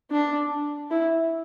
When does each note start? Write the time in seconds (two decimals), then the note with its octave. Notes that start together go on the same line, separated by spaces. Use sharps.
0.11 D4
0.90 E4